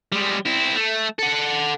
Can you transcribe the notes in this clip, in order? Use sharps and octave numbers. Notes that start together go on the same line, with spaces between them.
G3 G#3
C4 E4
A3
A4 F#5